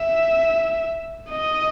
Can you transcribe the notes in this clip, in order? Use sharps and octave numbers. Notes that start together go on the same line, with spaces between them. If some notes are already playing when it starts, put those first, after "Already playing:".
Already playing: E5
D#5